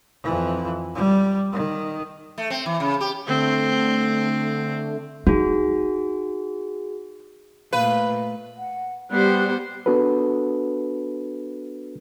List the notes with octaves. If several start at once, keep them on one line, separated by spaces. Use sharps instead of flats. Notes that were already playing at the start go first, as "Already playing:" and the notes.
F2 E3
G3
D#3
A3
C4
E3
C#3
G4
D3 A3 C4
D#4 F#4 G#4
A#2 A3 B4 F5
F#5
G3 B3 C5 F#6
B3 D4 F#4 A4 B4